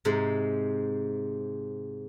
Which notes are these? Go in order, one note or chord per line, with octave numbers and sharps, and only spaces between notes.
G#2 C3 G#3